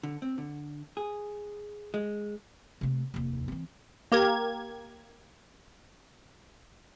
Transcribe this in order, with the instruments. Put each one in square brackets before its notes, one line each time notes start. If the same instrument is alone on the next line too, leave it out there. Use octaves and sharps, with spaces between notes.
[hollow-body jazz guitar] D3
C4
D3
G#4
G#3
[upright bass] C3 A3
F1 D#2
E3 C4
[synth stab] A#3 G4 A#4 G#6